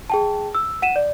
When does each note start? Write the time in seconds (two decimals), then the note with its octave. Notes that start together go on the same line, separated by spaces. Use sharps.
0.10 G#4 G5 A5
0.55 E6
0.82 F#5 D#7 E7
0.96 D5